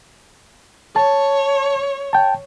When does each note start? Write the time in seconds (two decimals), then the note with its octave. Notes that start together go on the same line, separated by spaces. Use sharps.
0.96 C#5 A5
2.13 G5 A5